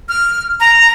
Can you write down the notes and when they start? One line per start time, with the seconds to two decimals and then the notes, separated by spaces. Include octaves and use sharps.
0.09 F6
0.60 A#5